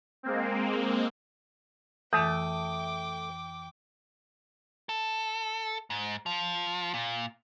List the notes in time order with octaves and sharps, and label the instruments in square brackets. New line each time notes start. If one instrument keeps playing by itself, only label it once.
[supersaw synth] G#3 A#3 C4
[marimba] F2 E3 [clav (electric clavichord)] A3 [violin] G5 D6 [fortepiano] D#6
[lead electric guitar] A4
G#2
F3
A#2